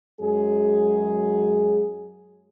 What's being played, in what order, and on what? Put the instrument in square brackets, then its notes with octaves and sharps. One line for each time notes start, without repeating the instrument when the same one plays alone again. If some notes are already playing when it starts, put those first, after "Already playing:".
[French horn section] F#2 F#3 G#3 G#4